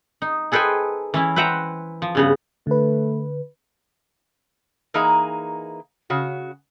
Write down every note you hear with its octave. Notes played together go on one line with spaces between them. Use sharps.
D#4
G#4 A4 B4 C5 G5 G#5
E3 C#4 E4
B4 C5 E5 F#5 G5 A#5
F3
G2 C#3 B3
D3 A3 B4
E3 A#3 D#4 G#4 A#5
C#3 F#4